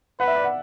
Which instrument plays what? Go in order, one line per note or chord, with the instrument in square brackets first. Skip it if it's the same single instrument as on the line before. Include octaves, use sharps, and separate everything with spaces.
[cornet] B4 [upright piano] F#5
[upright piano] E5
D5
F#5